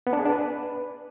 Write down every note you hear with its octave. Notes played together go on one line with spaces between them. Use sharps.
B3
D4
G#4
D4
B4